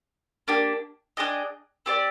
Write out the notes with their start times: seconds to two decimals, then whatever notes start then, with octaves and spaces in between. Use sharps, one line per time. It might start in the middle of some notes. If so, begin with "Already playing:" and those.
0.48 A#3 D4 G4
1.17 D4 G#4 D#5 G5
1.86 C4 G4 D5